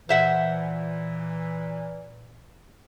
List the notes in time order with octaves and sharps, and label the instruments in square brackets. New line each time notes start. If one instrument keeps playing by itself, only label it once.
[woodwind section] A#2 E3 [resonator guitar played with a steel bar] C5 E5 F#5